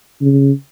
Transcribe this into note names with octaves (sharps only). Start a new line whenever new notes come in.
C#3